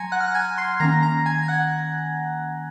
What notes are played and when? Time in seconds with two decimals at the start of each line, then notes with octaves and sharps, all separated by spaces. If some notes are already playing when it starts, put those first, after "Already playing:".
Already playing: F#3 G#5 A#5 C6 G#6 A#6 C#7
0.12 F#5 F#6
0.20 F6
0.27 F#6
0.35 G#5 G#6
0.58 C6 C7
0.80 D#3 A#3 C#4 A#5 A#6
1.02 A#5 A#6
1.26 G#5 G#6
1.43 G#6
1.48 F#5 F#6